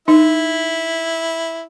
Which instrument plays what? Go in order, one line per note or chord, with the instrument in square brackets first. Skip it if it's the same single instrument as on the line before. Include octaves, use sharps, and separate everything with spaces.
[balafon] D#4 [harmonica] E4